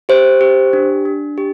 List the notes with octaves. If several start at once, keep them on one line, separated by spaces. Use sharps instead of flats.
G4 C5
G4
D4
D4
G4